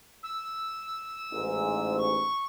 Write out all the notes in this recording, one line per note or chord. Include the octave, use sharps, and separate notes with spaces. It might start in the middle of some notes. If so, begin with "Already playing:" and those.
E6
A1 G#2
C#6